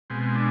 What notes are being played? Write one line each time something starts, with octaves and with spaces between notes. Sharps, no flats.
B2 G#3 C4
D4